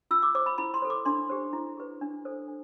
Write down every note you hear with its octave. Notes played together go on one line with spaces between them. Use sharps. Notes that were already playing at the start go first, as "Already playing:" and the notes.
F4 E6
D6
C5 D6
B5
E4 B5
C6
A4 C5
D6
D4 C6
G4 C5
E4
G4 B4
D4
A4 C5
D4